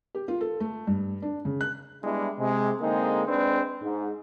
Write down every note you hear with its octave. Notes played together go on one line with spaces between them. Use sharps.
G4
F4
A4
A3
G2
D4
C#3
F#6
G3 G#3 B3 D4 E4
C3 G#3
D3 G#3 A#3 C4 D#4 G#4
G#3 C4 D4 B4
G#2